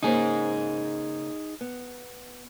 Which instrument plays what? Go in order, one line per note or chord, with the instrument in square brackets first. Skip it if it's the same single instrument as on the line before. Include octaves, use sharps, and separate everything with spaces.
[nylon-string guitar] C#3 A#3 C5 [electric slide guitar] D#4 G#4
[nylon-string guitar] B3